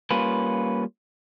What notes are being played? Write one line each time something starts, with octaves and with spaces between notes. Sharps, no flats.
G3 A#3 C#4 F4 B4